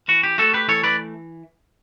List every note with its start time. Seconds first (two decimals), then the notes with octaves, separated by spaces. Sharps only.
0.08 E3 F#4
0.23 G4
0.38 A3 F#4 A4
0.54 G4 B4
0.68 E3 A4 C#5
0.84 B4 D5